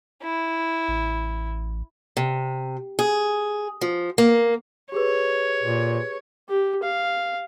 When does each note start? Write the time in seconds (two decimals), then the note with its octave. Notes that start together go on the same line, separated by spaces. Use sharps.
0.23 E4
0.88 A1
2.17 C3
2.99 G#4
3.81 F3
4.18 A#3
4.92 G4 G#4 B4 C#5
5.63 A#2
6.49 G4
6.83 F5